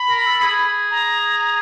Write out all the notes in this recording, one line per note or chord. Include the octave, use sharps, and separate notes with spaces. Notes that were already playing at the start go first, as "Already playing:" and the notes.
Already playing: B5
A#4
A4
G#4
A#5